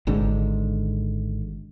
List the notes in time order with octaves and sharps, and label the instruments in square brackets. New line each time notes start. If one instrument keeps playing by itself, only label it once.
[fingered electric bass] G#1 G#2 D3